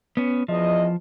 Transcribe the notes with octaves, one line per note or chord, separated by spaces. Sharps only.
B3 C#4
E2 F3 D#5